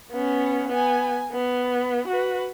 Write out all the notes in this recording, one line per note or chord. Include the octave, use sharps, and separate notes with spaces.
B3 C#4
B3 G#5
B3
F#4 B4